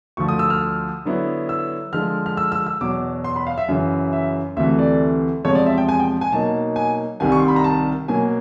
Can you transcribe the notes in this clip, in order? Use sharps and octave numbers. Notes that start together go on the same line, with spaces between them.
D2 D3 F3 C#6
D#6
E6
F6
D3 F#3 B3 E4
E6
D3 F3 G#3 F6
F6
E6
E6
E6
E2 B2 F#3 D6
C6
B5
F5
E5
F#2 C#3 E3
E5
D2 C3 E3 A3 E5
D5
E2 C3 F3 G#3 C#5
D5
E5
G5
G#5
G5
G#5
B2 F#3 A#3 D#4 A5
G#5
C2 C3 D#3 G3 G#5
C#6
C6
B5
A#5
A5
B2 F#3 A#3 G#5